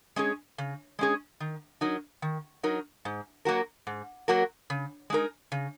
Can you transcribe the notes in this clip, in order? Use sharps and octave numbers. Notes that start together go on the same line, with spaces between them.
G#3 C#4 G#4
C#3
G#3 C#4 G#4
D#3
F#3 D#4 A#4
D#3
F#3 D#4 A#4
G#2
F#3 A#3 F#4 A#4
G#2
F#3 A#3 F#4 A#4
C#3
G#3 D#4 A#4
C#3